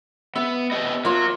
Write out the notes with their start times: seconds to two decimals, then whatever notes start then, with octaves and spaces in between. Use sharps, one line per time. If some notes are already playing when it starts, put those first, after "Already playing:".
0.36 B3 E5
0.71 B3 G4 D#5
1.05 F#3 A#3 F4